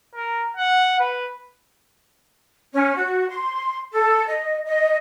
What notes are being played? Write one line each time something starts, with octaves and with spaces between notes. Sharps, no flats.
A#4
F#5
B4
C#4
F#4
C6
A4
D#5
D#5